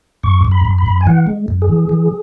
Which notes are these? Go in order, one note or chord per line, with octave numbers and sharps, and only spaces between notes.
F#2 C#6
F#2
B5
F#2
B5
F#2
G#5
E3 F#5
G#3
F#2
G#4
E3
E3